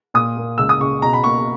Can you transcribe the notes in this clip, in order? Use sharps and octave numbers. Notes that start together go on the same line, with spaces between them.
A#2 D#6
A#3
C#2 E6
D#6
C#3 C#6
B2 A#5
B5
A#3 C#6